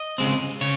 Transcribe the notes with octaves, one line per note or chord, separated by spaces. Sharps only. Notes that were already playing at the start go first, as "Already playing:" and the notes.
Already playing: D#5
C#3 G#3 C4
C#3 C#5